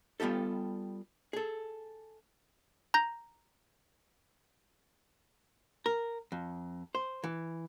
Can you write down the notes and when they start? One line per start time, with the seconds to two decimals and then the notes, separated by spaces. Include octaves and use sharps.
0.20 G3 B3 F4 G4 A4
1.33 G#4 A4
2.94 A#5 G6 A#6
5.86 A#4
6.32 F2
6.95 C5
7.24 E3